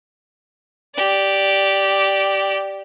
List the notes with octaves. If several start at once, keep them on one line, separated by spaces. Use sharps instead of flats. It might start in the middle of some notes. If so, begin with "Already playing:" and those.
G4 D5